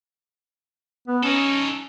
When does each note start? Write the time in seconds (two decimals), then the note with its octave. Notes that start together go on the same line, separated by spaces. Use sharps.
1.08 B3
1.24 C#4 D#4 A4